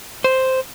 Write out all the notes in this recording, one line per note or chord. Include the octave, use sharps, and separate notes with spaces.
C5